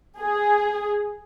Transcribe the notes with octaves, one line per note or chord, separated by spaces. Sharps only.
G#4